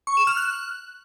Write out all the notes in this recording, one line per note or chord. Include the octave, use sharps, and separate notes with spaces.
C#6
E7
F6
F#6